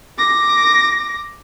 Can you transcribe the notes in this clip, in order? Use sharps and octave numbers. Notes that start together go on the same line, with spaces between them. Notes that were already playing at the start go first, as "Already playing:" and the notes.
D6 A#6